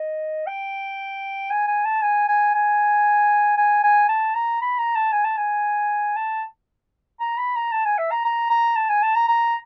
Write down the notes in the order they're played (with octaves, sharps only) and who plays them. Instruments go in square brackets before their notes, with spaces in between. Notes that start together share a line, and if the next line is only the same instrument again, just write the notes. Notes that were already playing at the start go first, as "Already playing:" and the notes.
Already playing: [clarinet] D#5
G5
G#5
G#5
A5
G#5
G#5
G#5
G#5
G#5
A5
A#5
B5
A#5
A5
G#5
A5
G#5
A5
A#5
B5
A#5
A5
G#5
E5
A#5
A#5
A#5
A5
G#5
A5
A#5
A#5